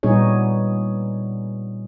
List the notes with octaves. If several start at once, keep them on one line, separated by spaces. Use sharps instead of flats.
A#2 G3 B3 D#4 G#4 C#5